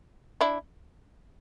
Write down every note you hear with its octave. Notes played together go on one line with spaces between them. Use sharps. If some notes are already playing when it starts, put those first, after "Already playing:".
D4 E4